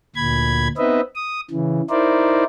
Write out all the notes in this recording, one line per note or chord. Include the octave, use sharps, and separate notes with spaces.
D2 A#2 B5 G#6
B3 C4 D#4 B4 D#5 E5
D#6
C#3 E3
D#4 E4 A#4 C5 D5